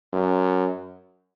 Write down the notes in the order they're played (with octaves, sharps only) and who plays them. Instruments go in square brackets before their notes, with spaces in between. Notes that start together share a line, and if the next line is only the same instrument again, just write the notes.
[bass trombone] F#2